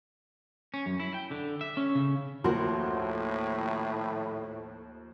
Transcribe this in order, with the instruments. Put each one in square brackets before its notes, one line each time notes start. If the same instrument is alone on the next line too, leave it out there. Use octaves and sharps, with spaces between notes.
[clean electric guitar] C#4
F#2
E4
G5
D3
E5
C#4
C#3
[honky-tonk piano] D#2 F3 C6 [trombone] A2 [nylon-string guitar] F#4 A#4